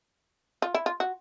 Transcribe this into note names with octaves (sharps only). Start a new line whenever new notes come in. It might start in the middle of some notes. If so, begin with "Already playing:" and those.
F4
E4
F4
F#4